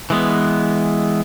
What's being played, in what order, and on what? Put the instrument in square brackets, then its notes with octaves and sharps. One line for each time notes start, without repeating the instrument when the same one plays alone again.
[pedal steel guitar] E3 G#3 B3